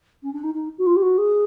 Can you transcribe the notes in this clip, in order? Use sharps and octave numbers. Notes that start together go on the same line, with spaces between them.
C#4
D4
D#4
D#4
F#4
F4
G4
F#4
G#4